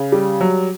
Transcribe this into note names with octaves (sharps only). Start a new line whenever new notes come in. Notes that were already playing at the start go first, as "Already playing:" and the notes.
Already playing: C#3
G3
F#3